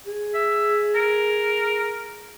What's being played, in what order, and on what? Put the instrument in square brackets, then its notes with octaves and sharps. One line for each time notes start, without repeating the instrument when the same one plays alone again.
[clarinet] G#4
[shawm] E5
A#4